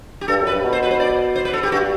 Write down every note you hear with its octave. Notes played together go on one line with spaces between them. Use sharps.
G4
G2 A4
F#2
B4
G2
B2
C5
B4
C5
D5
C5
B4
A4
G4
G2 F#4